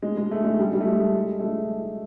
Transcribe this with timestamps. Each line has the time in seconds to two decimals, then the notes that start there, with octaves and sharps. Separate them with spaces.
0.02 G#3
0.17 G#3
0.31 A3
0.44 G#3
0.59 G3
0.73 G3
0.80 A3
0.87 G#3
1.39 A3
1.43 G#3